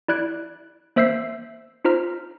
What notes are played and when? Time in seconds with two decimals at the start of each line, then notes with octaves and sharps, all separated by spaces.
0.08 E4 D5 F#6 G#6 D7
0.96 A#3 C5 E5 E6 G6 C7
1.85 D#4 F4 C5 A#5 F6